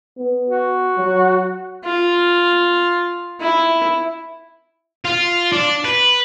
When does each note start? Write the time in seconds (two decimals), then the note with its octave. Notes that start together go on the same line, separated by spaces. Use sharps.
0.18 B3
0.48 F#4
0.97 F#3
1.85 F4
3.41 E4
5.05 F4
5.52 D4
5.85 B4